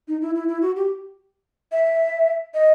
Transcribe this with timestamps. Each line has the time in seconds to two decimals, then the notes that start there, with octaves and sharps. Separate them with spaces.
0.08 D#4
0.21 E4
0.35 E4
0.48 E4
0.62 F#4
0.76 G4
1.72 E5
2.54 D#5